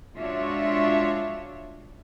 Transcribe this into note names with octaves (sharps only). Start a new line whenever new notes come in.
G#3 D4 F4 F#4 C#5 E5